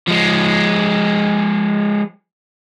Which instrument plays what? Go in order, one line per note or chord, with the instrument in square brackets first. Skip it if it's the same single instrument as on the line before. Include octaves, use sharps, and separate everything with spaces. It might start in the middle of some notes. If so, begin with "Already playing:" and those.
[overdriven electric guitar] F3 G#3